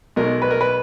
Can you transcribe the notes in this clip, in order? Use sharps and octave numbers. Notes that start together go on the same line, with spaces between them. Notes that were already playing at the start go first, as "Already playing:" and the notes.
B1 B2 G#3 D#4 A#4
B4
A#4
B4